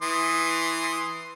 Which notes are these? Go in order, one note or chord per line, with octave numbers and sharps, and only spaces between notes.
E3 C6 D#6